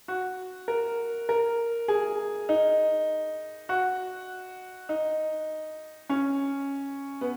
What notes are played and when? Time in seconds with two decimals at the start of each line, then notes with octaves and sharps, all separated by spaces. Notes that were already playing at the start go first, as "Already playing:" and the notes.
0.08 F#4
0.68 A#4
1.29 A#4
1.88 G#4
2.49 D#4
3.69 F#4
4.89 D#4
6.09 C#4
7.21 B3